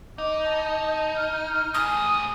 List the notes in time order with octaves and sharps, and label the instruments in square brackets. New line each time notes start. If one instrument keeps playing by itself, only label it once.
[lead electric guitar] D#4 [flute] D6
[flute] A5
F6
[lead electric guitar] A2 G#4 [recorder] D#6